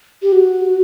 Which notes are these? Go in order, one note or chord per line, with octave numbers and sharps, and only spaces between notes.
G4
F#4